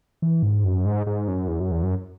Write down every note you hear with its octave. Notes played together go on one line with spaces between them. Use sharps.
E3
G#2
F#2
G#2
G#2
F#2
E2
F#2
E2
F#2